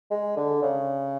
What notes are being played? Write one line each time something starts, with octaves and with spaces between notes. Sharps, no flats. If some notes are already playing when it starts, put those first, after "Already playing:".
G#3
D3
C#3